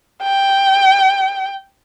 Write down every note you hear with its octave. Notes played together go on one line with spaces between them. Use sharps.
G5